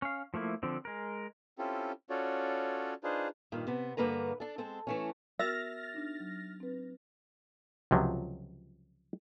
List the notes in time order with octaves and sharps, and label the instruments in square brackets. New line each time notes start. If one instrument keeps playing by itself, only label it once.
[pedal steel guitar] C#4 F5
F3 A3 A#3 E4
D3 F3 C4
G#3 A#4
[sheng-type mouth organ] C4 C#4 E4 F4 G4 A4
C#4 F4 F#4 A4 C#5 D5
D4 D#4 F4 G#4 B4 C5
[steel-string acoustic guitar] G2 A#2 D#3
C3 B3
G2 D3 D#3 A#3 B4 A#5
D4 A4
G#3 C4 A4
E3 A3 C#4
[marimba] B3 F#4 A#4 [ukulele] E5 [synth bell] F6 A6 A#6
[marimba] D4 D#4
F#3
C4 B4
[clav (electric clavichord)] C#2 C3 F3 F#3